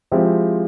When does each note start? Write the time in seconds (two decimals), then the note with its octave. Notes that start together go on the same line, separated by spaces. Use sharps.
0.11 F3 G#3 C4 E4 G4